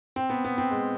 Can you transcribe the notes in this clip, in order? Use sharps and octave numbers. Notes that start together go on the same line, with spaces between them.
C4
B3
B3
C4
G#3